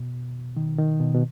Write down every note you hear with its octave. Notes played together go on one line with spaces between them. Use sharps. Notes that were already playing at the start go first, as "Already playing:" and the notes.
Already playing: B2
D#3
D#3
B2
B2